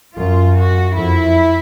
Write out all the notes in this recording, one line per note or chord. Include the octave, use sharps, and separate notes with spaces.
F#2 F4
F#4
F2 E4